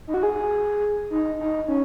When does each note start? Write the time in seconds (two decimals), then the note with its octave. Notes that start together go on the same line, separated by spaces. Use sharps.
0.07 D#4
0.14 F#4
0.23 G#4
1.10 D#4
1.40 D#4
1.68 C#4